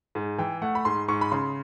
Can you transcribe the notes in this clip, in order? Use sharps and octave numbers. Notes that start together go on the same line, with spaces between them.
G#2
E3 G5
A3 F#5
B5
G#2 C6
G#2 C#6
B5
C#3 C6